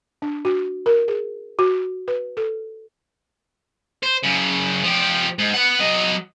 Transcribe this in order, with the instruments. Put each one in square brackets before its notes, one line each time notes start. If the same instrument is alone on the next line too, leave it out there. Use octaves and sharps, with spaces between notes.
[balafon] D4
F#4
A#4
G#4
F#4
B4
A4
[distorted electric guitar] C5
F#2 C#3
F3 G4
G#2
B3 F#5
F#3 D#5